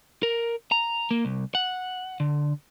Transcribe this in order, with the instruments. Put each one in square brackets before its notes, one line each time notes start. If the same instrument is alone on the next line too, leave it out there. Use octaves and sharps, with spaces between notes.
[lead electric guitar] A#4
A#5
A#3
C2
F#5
D3